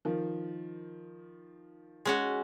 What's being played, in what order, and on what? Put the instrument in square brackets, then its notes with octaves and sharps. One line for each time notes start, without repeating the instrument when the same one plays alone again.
[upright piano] D#3 F3
[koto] G#3 C#4 F#4